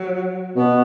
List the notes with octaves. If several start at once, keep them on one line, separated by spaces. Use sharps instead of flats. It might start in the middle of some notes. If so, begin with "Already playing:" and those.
Already playing: F#3
B2 B3